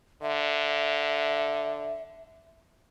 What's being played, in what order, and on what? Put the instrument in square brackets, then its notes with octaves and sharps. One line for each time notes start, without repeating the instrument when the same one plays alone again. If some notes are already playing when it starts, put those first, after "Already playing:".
[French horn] D3 [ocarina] E5